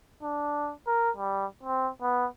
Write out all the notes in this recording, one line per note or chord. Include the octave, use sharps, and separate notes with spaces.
D4
A#4
G3
C4
B3